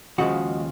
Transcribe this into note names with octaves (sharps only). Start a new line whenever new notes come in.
D#2 C#3 F3 G#3 F#4